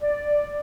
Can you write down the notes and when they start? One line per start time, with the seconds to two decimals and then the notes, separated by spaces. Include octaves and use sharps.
0.02 D5